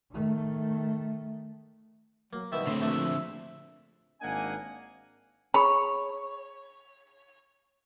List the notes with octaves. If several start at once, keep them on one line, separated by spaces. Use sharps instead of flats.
D#3 A3
F#3 A#3
C2 B2 D#3 E5
A2 D3 C4 C6 D#6
A#1 A3 E5
G#1 A#3 D4 D#5 F#5 G#5
G#4 C#5 B5